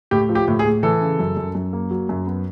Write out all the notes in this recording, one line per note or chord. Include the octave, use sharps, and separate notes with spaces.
A2 G4
F3
G4
A2
G#4
A2
E3 A4
C#3
F#2
F#2
F#2
A#3
F#3
F#2
B3